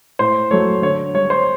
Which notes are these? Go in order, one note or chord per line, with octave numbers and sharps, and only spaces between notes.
A2 C5
F#3 A3 C#5
D3 C#5
G3 C#5
C5